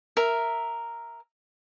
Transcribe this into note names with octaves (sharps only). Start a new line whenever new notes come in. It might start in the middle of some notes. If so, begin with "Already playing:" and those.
A#4 E5